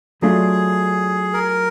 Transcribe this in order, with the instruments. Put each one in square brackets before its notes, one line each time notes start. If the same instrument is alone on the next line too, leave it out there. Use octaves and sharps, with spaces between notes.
[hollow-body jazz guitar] F#3 A3 D4 F4 [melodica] G#4
[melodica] A#4